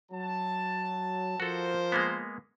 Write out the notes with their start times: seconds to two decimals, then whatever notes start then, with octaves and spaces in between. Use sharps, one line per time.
0.11 F#3 A5
1.40 F3 F#4 A4 A#4 C5
1.92 G#3 A#3 B3